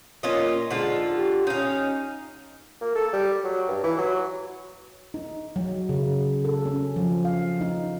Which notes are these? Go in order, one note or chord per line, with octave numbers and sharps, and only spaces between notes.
A#2 C#4 F4 D#5
G#2 D3 F4
G4
C#4 D#4 F5
A#3
A4
G3
F#3
G2
E3
F#3
D#4
F#3
C#3
A4
C#4
F3
F5
D#4